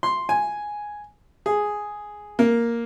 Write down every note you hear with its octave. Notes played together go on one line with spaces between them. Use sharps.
C6
G#5
G#4
A#3